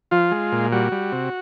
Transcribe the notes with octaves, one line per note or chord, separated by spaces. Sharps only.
F3 F4
G#3
A#2
G3 F#4
G3
C3